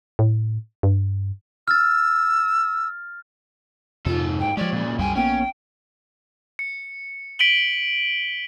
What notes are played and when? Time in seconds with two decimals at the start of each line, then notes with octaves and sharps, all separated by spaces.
0.19 A2
0.83 G2
1.68 E6 F6 A6
4.06 F2 G#2 C3 F4 A4
4.40 G5
4.57 F3 G#3 G4 C#5 D5
4.72 A#2 C#3
4.99 C2 F#2 G3 G#3 G5 G#5
5.15 A#1 A#3 B3 C#4 G5
6.59 C#7
7.39 B6 D7 D#7 F#7 G7